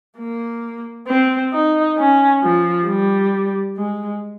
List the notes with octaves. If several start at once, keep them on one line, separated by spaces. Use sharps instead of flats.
A#3
C4
D#4
C#4
F3
G3
G#3